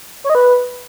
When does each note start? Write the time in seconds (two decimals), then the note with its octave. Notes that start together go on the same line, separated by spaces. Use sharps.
0.24 C#5
0.30 D#5
0.35 B4